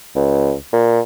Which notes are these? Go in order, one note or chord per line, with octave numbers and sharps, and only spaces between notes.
C#2
A#2